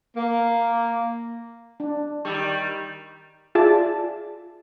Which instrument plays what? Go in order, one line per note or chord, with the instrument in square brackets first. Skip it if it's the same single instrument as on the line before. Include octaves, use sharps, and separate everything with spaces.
[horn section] A#3
[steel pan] D4
[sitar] D#3 G3 [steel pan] C#6 E6
[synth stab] F4 G#4 D5 E5 A5